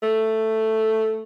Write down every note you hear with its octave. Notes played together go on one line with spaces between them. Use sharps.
A3